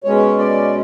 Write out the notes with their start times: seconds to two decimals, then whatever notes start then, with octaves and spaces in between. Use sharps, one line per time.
0.04 B2 G#3 C#4 C#5
0.38 D5